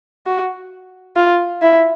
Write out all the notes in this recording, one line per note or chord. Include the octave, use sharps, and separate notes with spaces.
F#4
F4
E4